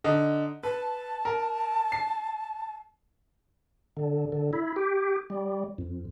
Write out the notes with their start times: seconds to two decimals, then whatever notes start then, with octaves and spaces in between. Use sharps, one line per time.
0.04 D3 D#4
0.63 B4 A5
1.25 A#4
1.92 C7
3.97 D3
4.32 D3
4.53 E4
4.76 G4
5.30 G3
5.78 F2